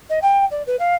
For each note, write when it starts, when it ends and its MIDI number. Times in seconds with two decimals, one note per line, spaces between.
0.09 0.19 75
0.22 0.45 79
0.51 0.63 74
0.67 0.76 71
0.79 0.94 77